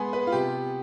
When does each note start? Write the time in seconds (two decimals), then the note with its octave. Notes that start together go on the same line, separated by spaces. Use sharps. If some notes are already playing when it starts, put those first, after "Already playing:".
Already playing: G#3 B3 G#5 B5 C6
0.13 B4
0.27 F4
0.32 C3 G4